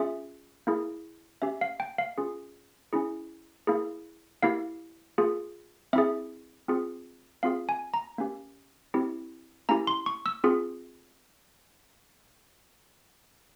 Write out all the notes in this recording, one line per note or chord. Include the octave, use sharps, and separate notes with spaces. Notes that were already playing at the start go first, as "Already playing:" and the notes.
Already playing: C#4 F4 G#4 E5
A#3 E4 G#4
C#4 G4 E5
F5
G5
F5
C#4 F4 G#4
C#4 E4 G#4
A#3 E4 G#4
A#3 E4 G4 F5
A#3 F4 G#4
C4 E4 G#4 E5
C4 F4 G#4
C4 F4 G#4 F5
G#5
A#5
A#3 C#4 G4
C4 E4 G4
A#3 C#4 E4 G4 A#5
C6
C#6
E6
C4 F4 G#4